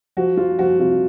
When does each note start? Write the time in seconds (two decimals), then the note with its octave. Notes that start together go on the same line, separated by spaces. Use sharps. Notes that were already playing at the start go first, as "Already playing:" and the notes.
0.17 F3 F#4
0.37 F3 F4
0.59 F3 F#4
0.80 C3 F4